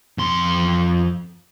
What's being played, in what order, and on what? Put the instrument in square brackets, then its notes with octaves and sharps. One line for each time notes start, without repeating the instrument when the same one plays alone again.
[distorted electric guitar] F2 C6